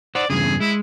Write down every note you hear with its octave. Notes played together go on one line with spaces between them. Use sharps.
C5 D5 F#5
E2 G2 C#3 G#4
G#3 E4